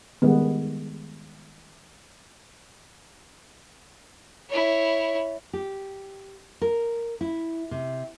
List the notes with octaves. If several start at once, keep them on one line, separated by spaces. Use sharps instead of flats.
D#3 G3 G#3 B3
E4 C#5
G4
A#4
E4
C3